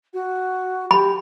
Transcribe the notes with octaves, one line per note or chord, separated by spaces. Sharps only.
F#4
G4 B5